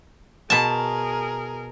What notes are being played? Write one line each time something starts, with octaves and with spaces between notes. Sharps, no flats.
B2 G#4 A#4 A5